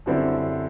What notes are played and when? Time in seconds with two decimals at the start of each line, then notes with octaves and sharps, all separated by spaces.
0.06 F#2 D3 G3 C4 E4